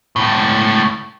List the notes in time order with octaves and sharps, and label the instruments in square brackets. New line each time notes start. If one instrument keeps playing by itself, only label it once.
[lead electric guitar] C#2 A2